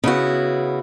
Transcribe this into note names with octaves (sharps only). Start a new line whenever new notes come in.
C#3 B3 E4 F#4